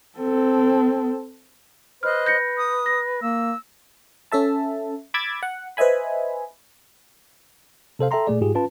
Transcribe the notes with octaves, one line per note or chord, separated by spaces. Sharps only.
C4 A4
B4 C5 D#5 F6 F#6
G6 A#6 C#7
D#6
A#6
A#3 E6
C#4 A4 E5 A5
B5 D6 E6 G#6 A6
F#5
B4 C5 D#5 E5 G#5 B5
C3 A4 C5 F5
A4 E5 G5 A#5 C6
A#2 A3 G#4 D5
G#2 F4 G4 G#4
C#4 F4 B4 A5